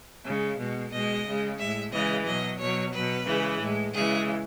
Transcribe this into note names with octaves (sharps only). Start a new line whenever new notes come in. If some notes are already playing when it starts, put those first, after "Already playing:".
C#3 G#3
B2 G#3
B2 G#3 D#5
C#3 G#3
A2 G#3 E5
C#3 E3 G#3 D#5
B2 F#3 D#5
B2 F#3 C#5
B2 F#3 B4
C#3 E3 G#3
A2 G#3
C#3 E3 G#3 G#4